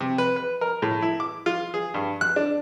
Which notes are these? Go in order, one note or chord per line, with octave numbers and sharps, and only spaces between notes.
C3
B4
B4
A#4
A2
E4
D6
F4
G#4
G2
F#6
D4